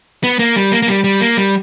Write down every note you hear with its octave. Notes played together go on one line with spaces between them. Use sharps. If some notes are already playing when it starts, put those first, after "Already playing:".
B3
A#3
G3
A#3
A#3
G3
G3
A#3
G3